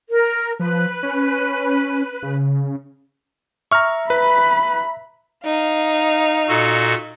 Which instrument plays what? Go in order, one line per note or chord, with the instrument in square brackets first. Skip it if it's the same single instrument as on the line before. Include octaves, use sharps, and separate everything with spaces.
[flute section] A#4
[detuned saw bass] F3 [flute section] B4
[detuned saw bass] C#4
C#3
[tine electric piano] E5 A#5 [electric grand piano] C#6 F6
[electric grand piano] B4 [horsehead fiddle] B5
[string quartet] D#4 F5
[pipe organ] A#2 F#4 A4